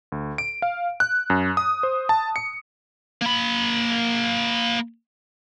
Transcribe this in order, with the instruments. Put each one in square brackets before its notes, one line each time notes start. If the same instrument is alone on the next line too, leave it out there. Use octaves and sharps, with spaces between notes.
[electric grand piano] D2
D7
F5
F#6
F#2
D#6
C5
A5
C#7
[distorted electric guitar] A#3 B5